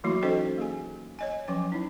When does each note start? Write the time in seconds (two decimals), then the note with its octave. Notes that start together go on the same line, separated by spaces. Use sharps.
0.04 E3 F#3 A3 A#3 E4 F#4
0.23 C#4 D#4 F#4 A4 C5 D#5
0.58 A#3 G#4 G#5
1.19 C#5 D#5 G#5
1.48 F3 F#3 C#4 G#5
1.72 D#4 E4